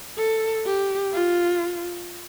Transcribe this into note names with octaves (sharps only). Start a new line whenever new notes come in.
A4
G4
F4